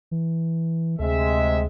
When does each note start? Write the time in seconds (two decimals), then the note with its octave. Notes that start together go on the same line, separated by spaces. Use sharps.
0.11 E3
0.99 D2 C3 G#3 E5